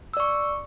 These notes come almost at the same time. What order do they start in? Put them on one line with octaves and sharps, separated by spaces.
E6 D5 C#6